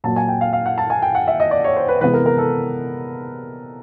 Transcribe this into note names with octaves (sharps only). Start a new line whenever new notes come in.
A#2 F#3 A#3 A5
G#5
G5
F5
F5
F#5
A5
G#5
G5
F#5
E5
D#5
D5
C#5
C5
B4
C3 E3 G#3 B3 B4
A#4
A#4
A4